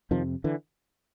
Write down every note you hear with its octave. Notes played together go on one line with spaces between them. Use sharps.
F2 C3 D#3 F3
D3 E3